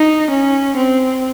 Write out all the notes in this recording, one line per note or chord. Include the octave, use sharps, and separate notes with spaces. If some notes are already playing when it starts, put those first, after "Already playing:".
Already playing: D#4
C#4
C4